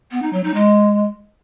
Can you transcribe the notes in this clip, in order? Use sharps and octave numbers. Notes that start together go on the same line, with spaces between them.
B3
D#4
F#3
D#4
G#3